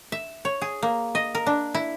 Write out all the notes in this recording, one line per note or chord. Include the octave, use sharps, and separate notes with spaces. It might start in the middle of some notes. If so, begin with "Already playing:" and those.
E5
C#5
G#4
A#3
D#5
A#4
D4
E4